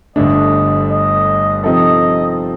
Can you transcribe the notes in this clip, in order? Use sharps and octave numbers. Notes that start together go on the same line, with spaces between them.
G1 G2 D3 A3 D4 D#5
D#5
C3 F3 C4 D#4 A4 D#5